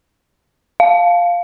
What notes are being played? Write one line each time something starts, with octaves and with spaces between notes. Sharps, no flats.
F5